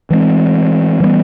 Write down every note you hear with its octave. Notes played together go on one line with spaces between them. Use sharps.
E3 G#3 C4
E3 G3 B3